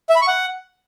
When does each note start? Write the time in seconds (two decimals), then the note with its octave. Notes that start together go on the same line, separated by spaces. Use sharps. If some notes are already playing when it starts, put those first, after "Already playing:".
0.09 E5
0.15 B5
0.22 C#6
0.28 F#5